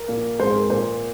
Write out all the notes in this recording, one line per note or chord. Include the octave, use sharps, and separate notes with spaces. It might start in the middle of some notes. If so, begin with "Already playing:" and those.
Already playing: A#4
A#2 A#3
G#2 G#3 C4 C5
A#4
A#2 A#3 C5